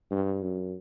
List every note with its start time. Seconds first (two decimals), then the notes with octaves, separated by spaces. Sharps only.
0.11 G2
0.42 F#2